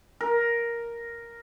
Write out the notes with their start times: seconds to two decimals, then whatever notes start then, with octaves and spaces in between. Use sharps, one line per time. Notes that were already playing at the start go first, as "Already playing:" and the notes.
0.21 A#4